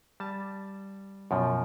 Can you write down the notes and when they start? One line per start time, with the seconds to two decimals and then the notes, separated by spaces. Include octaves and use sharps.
0.20 G3 A5
1.31 F#2 B2 F3